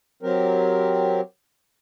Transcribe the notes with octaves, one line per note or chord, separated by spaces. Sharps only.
F#3 C4 G4 A#4